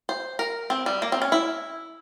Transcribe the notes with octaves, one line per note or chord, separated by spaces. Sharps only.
C5
A#4
C4
G3
A#3
C4
C#4
E4